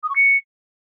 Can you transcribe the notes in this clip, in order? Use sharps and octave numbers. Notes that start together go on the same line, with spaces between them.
D#6
C#6
C#7